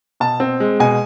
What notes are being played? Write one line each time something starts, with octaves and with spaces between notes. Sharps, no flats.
B2 A5
C4
G#3
B2 G#5